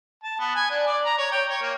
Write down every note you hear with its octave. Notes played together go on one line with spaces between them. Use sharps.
A5
B3
G#5
D4
D5
A#5
C#5
G5
C#5
A#3